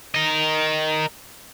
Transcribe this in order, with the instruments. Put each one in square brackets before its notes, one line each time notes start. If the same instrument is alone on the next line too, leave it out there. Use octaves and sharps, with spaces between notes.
[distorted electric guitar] A#4 D#5